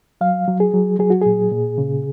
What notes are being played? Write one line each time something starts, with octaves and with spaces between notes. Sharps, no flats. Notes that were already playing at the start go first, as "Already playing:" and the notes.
F#3 F5
F#3
G#4
F#3
F#3 G#4
F#4
A#2 G#4
A#2
C#3